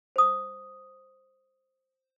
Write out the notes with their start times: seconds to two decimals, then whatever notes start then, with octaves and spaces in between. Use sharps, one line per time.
0.16 C5 D#6